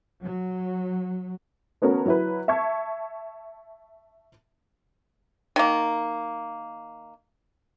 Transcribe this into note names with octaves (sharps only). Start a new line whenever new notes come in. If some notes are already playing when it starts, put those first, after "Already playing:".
F#3
A3 B3 C#4 F#4 A#4
F#3 E4 B4
E5 A5 C#6 G#6
D#3 A#3